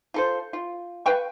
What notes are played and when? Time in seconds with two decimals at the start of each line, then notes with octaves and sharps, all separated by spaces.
0.14 F4 A4 C5
0.53 F4
1.06 B4 F5 G5 C#6